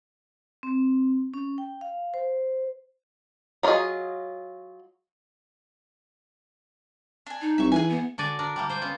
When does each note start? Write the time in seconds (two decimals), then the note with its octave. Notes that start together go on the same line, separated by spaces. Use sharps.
0.63 C4
1.34 C#4
1.58 G5
1.81 F5
2.14 C5
3.63 F#3 D#4 F4 G#4 D#5
7.27 D4 G#5
7.41 D#4
7.58 C2 E5 C#6
7.72 E3 G#4 B4 G#5
7.90 B3
8.18 D3 F#4 D5 G#5
8.39 D4 A#4
8.56 G3 A3 A#3
8.69 C5 G5 G#5
8.81 B3 C#4 F4